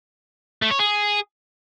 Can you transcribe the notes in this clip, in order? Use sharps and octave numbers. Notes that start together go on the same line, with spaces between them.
A3
C#5
G#4